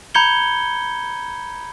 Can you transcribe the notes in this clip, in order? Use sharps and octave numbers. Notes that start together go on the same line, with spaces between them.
A#5 B5 G6 G#6 C#7 G7